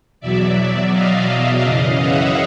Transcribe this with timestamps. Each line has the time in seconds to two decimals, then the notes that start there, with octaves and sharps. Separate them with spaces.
0.20 E2 B2 F#3 D5 E5
0.92 D#5 F5
1.27 D#5 F5
1.63 F#2 C#3 E3 D#5 F5
1.99 E5 F#5